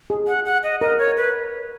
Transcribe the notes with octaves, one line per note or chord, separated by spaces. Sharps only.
G#4
F#5
F#5
D#5
A#4 D#5
C#5
B4